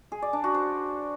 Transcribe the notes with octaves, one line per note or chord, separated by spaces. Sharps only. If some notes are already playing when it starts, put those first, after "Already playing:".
G#4
D5
D4
F#4
C5